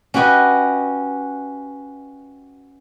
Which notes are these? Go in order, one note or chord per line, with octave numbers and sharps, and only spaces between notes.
C#4 F#4 G4 B4 D#5